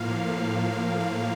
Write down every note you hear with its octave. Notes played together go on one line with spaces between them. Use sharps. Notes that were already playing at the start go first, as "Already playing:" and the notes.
Already playing: A2 F3 A#3 F5
F5
F5